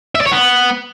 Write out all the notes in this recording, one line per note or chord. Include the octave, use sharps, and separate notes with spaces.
E5
D5
C#5
B3